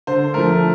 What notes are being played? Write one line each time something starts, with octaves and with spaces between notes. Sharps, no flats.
D3 C5
F3 A3 A#4